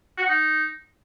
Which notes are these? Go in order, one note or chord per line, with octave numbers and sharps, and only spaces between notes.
F#4
F#5
D#4